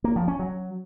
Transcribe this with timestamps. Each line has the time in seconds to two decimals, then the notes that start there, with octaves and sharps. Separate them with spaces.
0.04 A#3
0.16 F3
0.28 C#4
0.39 F#3